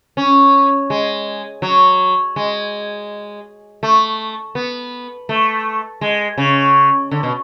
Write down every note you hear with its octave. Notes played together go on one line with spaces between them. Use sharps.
C#4
G#3
F#3
G#3
A3
B3
A3
G#3
C#3
D3
B2